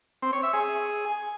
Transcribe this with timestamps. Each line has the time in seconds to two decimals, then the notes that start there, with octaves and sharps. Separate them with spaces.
0.22 C4
0.33 C#5
0.43 E5
0.54 G#4